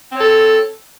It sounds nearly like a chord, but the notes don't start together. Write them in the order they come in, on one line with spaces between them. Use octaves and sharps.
C4 C#5 A4